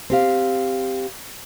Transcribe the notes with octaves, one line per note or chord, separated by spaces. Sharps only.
C4 G4 F5